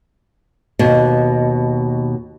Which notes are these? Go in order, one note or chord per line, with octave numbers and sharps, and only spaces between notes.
D#2 B2